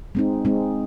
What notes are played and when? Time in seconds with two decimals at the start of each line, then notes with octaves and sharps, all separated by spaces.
0.15 G#3 C4 D#4
0.45 G#3 C4 D#4